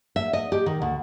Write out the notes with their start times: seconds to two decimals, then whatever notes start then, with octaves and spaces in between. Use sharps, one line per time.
0.16 E5
0.33 D#5
0.52 G4
0.66 D#3
0.82 D2